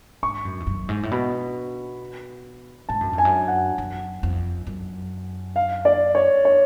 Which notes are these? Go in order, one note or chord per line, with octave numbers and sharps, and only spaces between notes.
G#2 C#6
F#2
F2
F#2
G#2
A2
B2 B5
G#2 A5
F#2
F2
G#5
F#2
F#5
F#2
F2
F#2
F5
D5
C#5
C#5